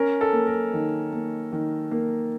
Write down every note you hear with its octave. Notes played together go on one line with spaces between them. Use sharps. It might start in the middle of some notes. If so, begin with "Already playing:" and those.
Already playing: C#4 A#4
A4
A#3
A#4
D#3
A#3
D#3
A#3